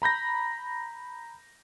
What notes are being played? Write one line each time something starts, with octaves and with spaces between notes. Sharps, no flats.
A#5 B5 G6 A#6